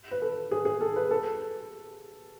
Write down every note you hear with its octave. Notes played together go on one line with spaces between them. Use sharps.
B4
A4
G#4
G#4
A4
B4
A4